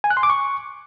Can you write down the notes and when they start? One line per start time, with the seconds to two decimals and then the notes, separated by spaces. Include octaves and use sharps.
0.04 G#5
0.10 F#6
0.17 C6
0.23 D6
0.30 C#6